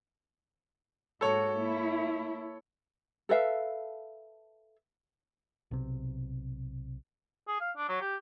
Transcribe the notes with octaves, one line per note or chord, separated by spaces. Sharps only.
G#2 A#3 F#4 A4 C#5
A#3 E4
A4 B4 E5 F5
B1 C3
G#4
F5
D4
F#3
G4